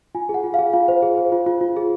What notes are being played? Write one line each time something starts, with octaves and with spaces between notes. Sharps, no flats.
F4 G#5
G#4
F#5
F4
G#4 F5
F4 F5
C5
G#4
C5
F4
F4
F4
G#4